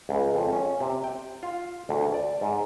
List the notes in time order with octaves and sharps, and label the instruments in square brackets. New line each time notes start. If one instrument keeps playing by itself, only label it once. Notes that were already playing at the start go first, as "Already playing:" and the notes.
[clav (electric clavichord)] C#2
F2
C#4
C3
G5
F4
D2
D5
G#2